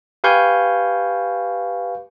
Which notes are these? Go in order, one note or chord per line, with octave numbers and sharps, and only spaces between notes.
G4 B4 F5 G#5 C#6 G6